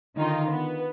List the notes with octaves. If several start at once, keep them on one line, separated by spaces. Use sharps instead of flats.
D3 D#3 D#4 F4
B3